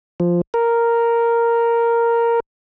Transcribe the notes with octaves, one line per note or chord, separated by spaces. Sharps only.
F3
A#4